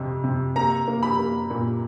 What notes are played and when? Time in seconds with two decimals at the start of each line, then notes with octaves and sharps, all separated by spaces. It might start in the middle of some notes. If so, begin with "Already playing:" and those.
Already playing: F2 C3
0.24 C3
0.56 A#3 A#5
0.88 A#3
1.03 B5
1.19 A#3
1.50 A#2